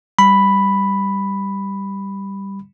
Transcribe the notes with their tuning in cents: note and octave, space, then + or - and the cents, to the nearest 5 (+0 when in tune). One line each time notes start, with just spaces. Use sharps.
G3 +0 B5 +0